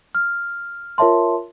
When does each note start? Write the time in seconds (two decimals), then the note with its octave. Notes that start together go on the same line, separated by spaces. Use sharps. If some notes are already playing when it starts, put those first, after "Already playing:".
0.15 F6
0.98 F4 A#4 C#5 E5 A5 C6